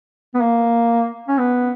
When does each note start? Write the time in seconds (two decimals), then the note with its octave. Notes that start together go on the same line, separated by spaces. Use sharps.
0.35 B3
0.41 A#3
1.28 C#4
1.38 B3